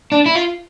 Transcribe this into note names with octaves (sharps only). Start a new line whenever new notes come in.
D4
E4
F4